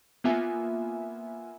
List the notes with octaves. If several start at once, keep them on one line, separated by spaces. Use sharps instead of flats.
A#3 B3 F4 E5 G#5